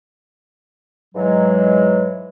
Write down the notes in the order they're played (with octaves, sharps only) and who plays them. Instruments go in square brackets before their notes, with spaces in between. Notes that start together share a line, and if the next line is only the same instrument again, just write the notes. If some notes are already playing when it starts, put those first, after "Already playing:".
[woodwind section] G#2 E3 F#3 G#3